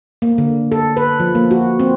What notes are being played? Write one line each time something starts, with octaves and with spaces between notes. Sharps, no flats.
A#3
D3
A4
B4
F3
A#3
F#4
C4